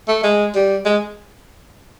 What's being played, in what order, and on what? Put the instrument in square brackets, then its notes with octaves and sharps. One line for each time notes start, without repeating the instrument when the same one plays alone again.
[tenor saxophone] A3
G#3
G3
G#3